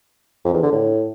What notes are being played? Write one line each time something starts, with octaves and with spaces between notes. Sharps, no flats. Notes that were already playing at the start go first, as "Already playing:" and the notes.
F2
E2
D3
A2